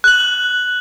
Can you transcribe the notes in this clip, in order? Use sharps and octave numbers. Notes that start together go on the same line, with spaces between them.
F#6 F#7